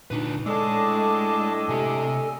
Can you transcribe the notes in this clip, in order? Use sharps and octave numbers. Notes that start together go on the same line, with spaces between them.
D2 A#2 D4 D#4 B4
A2 G#3 D4 A4 D#5 A5 D6
C3 G4 G#5